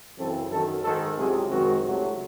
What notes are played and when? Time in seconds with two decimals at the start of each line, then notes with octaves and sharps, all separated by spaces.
0.18 F#2 C#3 E3 C4 A4
0.50 F#2 D#3 F#3 A4
0.83 G#2 D#3 G#3 A4
1.16 C#2 C3 F#3 C4 G#4
1.50 F#2 D#3 G#3 C4 F#4
1.84 C#2 C3 F#3 A3